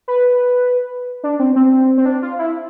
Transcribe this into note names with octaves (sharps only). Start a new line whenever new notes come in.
B4
D4
C4
C4
C4
D4
F4
E4